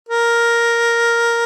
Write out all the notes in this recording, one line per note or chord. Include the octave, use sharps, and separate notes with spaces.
A#4